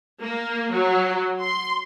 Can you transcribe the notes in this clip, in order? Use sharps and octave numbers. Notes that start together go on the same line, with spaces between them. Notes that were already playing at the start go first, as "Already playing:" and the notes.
A#3
F#3
C6